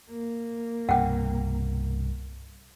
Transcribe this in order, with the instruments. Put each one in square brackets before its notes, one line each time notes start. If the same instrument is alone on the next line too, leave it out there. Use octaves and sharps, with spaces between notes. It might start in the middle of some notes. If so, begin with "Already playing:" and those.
[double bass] A#3
[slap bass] C2 G2 B2 [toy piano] F#5 G5